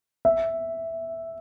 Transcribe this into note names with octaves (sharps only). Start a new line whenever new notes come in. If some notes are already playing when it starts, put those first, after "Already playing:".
E5